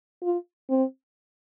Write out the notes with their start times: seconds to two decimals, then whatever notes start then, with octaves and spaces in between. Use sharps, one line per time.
0.22 F4
0.69 C4